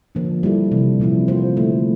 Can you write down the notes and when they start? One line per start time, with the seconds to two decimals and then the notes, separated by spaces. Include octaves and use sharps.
0.15 D3 F3 A#3 D4
0.43 G3 A#3 E4 A4
0.72 C3 E3 A#3
1.00 A#2 F3 C4 E4
1.28 A#3 F4 C5
1.57 D3 A3 E4